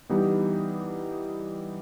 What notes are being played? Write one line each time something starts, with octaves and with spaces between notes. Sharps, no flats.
E3 G3 B3 D#4 G4